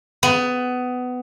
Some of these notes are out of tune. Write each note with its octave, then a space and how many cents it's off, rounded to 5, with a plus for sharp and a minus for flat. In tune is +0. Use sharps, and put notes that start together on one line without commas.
B3 +20